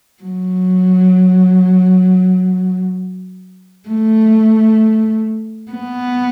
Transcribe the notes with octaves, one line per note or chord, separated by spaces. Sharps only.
F#3
A3
B3